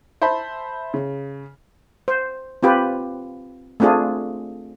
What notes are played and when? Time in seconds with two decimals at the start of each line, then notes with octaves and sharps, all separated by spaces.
0.22 C5 E5 A5 B5
0.94 C#3
2.08 C5
2.63 C4 F4 G4 B4
3.80 A3 C4 D4 F4 G#4